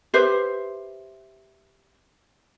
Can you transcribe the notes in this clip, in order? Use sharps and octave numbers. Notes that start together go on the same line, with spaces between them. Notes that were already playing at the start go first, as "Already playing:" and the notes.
G4 B4 C5 E5